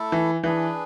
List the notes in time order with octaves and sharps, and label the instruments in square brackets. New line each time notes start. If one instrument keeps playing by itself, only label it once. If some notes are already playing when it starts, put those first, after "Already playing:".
Already playing: [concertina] A3 E4 A4
[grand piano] E3
[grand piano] E3 [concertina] D4 G#4 B4